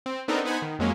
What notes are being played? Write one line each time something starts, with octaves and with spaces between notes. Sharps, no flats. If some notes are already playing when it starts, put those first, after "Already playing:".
C4
B3 C4 D4 D#4 A4 A#4
B3 D#4 C5 F#5 G#5 B5
D#3
F2 F#3 G#3 A#3 C#4